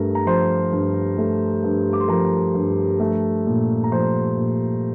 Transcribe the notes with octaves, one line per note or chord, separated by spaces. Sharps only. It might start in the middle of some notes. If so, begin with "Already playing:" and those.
Already playing: G2 A3 A#4
A#5
F3 C5 C6
G2
A3
G2
D6
C6
F3 A#4 A#5
G2
A3
A#2
A#5
F3 C5 C6
A#2